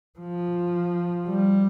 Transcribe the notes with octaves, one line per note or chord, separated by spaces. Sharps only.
F3
G3